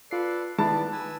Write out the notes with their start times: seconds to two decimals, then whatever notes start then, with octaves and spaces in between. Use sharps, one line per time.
0.11 F4 A4 B4 D5 C7
0.58 D#3 G#3 B3 E4 B4 D5 A5
0.92 B4 G#5 E6